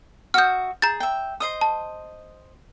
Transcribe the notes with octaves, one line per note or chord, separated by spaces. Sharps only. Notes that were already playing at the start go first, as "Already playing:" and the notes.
F#4 E5 D#6 F6 G6
G#4 A#5 G6 A6
E5 G5
C5 D#5 D#6
A5